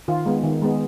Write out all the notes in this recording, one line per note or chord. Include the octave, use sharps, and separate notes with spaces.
D#3 F4
G#3 B3
D#3
G#3 B3